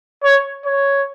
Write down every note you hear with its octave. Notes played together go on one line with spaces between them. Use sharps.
C#5
C#5